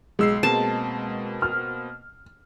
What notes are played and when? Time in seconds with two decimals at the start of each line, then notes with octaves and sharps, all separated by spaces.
0.19 B1 G#3 E6 C7
0.43 B2 A#3 C4 A5
1.42 F6